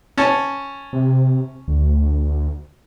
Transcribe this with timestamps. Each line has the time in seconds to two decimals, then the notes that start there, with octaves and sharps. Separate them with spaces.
0.18 C#4 A5
0.93 C3
1.68 D2